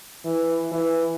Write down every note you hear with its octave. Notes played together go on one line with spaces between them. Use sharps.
E3
E3